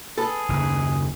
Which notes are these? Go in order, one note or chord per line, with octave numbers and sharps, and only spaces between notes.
G#4 A4 B4
F#1 D#2